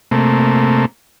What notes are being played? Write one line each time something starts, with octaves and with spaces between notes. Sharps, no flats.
C3 A3 A#3